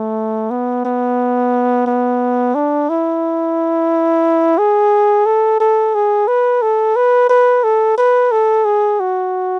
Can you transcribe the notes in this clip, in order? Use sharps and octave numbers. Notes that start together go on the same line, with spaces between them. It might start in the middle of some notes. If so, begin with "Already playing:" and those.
Already playing: A3
B3
B3
B3
D4
E4
G#4
A4
A4
G#4
B4
A4
B4
B4
A4
B4
A4
G#4
F#4